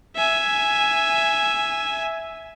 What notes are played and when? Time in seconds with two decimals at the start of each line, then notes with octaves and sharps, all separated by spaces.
0.16 E5 G#5